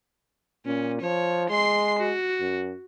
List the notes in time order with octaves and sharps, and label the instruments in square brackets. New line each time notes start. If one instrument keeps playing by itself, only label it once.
[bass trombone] A#2 [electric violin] C#4
[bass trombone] F3 [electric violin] C#5
[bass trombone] G#3 [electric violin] C6 C7
[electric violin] F#4
[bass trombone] F#2